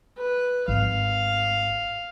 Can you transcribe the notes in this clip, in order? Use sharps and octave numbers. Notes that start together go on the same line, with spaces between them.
B4
G#1 F5